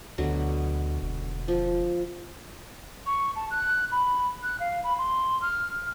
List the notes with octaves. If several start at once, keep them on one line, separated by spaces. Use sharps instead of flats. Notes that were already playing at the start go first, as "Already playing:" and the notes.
D2 B2 D3 F#3
E1
F3
C#6
A5
F#6
B5
F#6
F5
B5
C6
F6